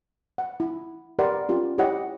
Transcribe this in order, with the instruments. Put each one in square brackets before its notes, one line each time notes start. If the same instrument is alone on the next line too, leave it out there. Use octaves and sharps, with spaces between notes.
[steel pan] F#5
E4
G4 A#4 B4 D5 F#5 C6
C#4 F4 G4
E4 G4 C#5 D#5 F#5